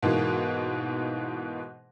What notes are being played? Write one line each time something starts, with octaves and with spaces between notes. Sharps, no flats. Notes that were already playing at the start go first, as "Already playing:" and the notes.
G#2 B2 E3 A#3